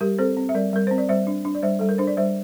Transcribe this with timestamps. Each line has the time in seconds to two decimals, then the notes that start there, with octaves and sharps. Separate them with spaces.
0.01 G3 G4 A#4
0.18 C4 A4 C5
0.37 C4
0.49 E5
0.54 G3 A#4 D5
0.73 G3 A#4
0.87 C4 C5
0.98 D5
1.09 G3 C5 E5
1.27 D4
1.45 D4
1.55 D5
1.63 G3 C5 E5
1.79 G3 A4
1.89 A#4
1.98 D4 C5
2.07 D5
2.17 G3 C5 E5